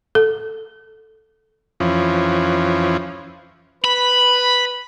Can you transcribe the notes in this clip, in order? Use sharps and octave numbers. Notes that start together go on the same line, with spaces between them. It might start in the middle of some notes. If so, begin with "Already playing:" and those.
A4
F2 E3 F3 C#4
B4 B5